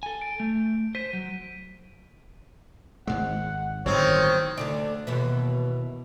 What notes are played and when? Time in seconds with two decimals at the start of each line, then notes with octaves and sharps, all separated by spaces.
0.03 A4 G#5
0.22 D7
0.40 A3
0.95 C5 B6 D#7
1.13 F#3
3.07 G#1 G#2 G#3 F#5
3.86 G1 A2 D#3 F#3 C4 C#5
4.57 D2 D3 D5
5.07 D#2 B2 E3